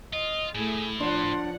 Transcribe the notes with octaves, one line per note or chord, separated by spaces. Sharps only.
F4 D#5
A2 A3 E4 G#4
F3 D4 C#5 F#5 C6